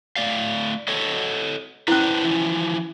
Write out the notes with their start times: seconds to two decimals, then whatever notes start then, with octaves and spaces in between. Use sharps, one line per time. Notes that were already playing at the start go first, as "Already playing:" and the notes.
0.16 A3 D5 F5
0.88 A4 C#5 D#5
1.88 C#4 D4 E4 B4 C5
2.24 E3 F3